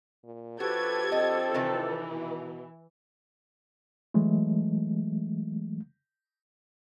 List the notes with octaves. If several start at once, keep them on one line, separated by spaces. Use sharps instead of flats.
A#2
F3 D4 F#4 G4 A4 B4 G#6
C4 D#5
C3 D#3 E3 D#4
B2
E3 F#3 G#3 A3